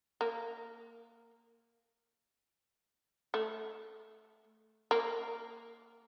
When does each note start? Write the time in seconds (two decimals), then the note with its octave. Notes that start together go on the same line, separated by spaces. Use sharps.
0.21 A#3
3.34 A3
4.91 A#3